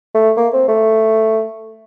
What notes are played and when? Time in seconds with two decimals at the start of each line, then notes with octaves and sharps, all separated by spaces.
0.14 A3
0.37 A#3
0.53 C4
0.68 A3